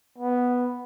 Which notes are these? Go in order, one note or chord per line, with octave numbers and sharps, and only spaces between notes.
B3